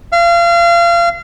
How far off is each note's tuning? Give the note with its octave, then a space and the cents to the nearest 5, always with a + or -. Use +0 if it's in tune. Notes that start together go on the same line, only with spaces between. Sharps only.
F5 -30